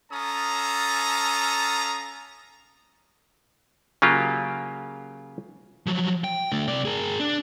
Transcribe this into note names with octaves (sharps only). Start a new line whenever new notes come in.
C#4 A4 F5 A5 A#5 D#6
C#3 F#3 A#3 F4 G4
F3 F#3
G5
D3 A3
C3 D5
G#4 A#4
D4